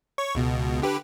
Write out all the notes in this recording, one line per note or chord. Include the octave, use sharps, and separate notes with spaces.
C#5 C#6
C#2 B2
D3 G4 B4